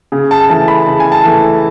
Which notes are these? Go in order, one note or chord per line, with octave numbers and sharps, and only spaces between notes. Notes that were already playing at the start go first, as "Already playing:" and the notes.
C#3
A5
E3 A3 A5
B5
C#3 A5
G#5
A5
E3 A3